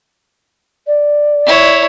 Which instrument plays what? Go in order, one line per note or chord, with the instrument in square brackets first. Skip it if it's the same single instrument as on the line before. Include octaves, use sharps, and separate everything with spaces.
[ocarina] D5
[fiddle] E4 C#5